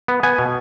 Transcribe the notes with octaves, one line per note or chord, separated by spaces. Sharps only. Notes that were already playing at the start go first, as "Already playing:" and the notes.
B3
B3 G#5
B2